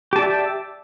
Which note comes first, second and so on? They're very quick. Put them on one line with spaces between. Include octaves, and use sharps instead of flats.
G4 A5 D5 E5